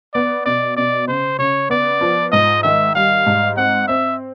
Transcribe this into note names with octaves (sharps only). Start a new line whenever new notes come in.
B3 D5
B2 D5
B2 D5
C#3 C5
C#3 C#5
B3 D5
F3
G#2 D#5
D#3 E5
G3 F5
G#2
C4 F#5
C4 E5